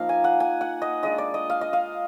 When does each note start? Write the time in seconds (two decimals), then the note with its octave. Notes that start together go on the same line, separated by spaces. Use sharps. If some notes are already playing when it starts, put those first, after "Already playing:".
Already playing: F3 A#3 D#4 F5
0.09 G#5
0.24 F#5
0.40 G#5
0.61 F#5
0.82 D#5
1.03 G#3 D4 F4 D#5
1.18 D5
1.34 D#5
1.50 F5
1.61 D#5
1.73 F5